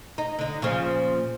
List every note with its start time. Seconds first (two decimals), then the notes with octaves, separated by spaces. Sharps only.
0.18 D#4
0.39 D3 D#4
0.62 A#2 C#3 F3